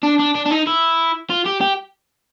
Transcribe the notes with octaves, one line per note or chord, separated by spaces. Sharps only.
D4
D4
D4
D4
D#4
E4
F4
G4
G4